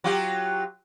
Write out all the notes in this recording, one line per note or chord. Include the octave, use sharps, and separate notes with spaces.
F#3 F4 G4